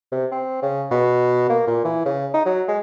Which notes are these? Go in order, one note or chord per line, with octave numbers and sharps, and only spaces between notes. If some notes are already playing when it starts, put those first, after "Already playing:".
C3
C4
C#3
B2
A#3
A#2
E3
C#3
D#4
F#3
G#3